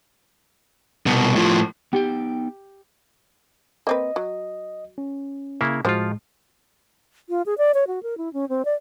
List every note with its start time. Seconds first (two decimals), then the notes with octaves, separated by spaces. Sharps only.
1.06 C2 B2
1.36 A2 F3
1.93 B3 D#4 G4 G5
3.87 A#3 C4 B4 D#5
4.16 F#3
4.98 C#4
5.61 C#3 A#3 E4
5.85 A2 F3 G#3 F4 F#4 C5
7.29 F4
7.46 G#4
7.58 D5
7.74 C#5
7.87 F#4
8.03 A#4
8.18 E4
8.33 C#4
8.49 C4
8.65 D5